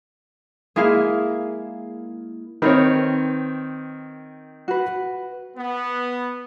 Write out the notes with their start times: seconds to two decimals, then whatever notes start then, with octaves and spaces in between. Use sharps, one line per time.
0.76 G#3 A#3 E4 G#4 F5
2.62 D#3 C4 A#4 B4 C#5
4.68 F#4 B4
5.57 B3